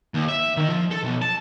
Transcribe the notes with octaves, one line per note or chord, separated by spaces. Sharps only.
D#2
E5
D#3
F3
A4
B1
A5